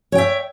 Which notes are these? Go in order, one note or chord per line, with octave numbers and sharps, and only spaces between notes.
C#5 E5 G5